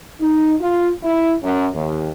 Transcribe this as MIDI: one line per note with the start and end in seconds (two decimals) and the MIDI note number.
0.20 0.54 63
0.60 0.90 65
1.03 1.33 64
1.43 1.67 42
1.74 2.09 39